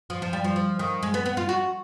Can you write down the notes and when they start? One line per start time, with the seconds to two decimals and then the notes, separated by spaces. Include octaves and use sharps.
0.10 F3
0.22 F3
0.33 G3
0.44 F3
0.56 F3
0.79 D#3
1.03 G#3
1.14 B3
1.26 B3
1.37 F4
1.49 F#4